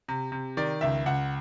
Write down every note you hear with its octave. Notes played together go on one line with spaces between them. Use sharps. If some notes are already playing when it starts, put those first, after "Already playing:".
C3
C3
D#3 D5
C#2 E5
C#2 F#5